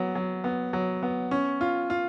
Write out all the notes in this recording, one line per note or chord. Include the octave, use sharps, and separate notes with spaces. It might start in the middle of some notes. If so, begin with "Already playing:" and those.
Already playing: F#3 B3
F#3
B3
F#3
B3
C#4
F4
F4